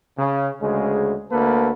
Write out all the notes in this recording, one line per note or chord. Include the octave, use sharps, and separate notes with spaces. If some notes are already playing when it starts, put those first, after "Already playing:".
C#3
D2 C#3 G#3
D2 A#3 A4 B4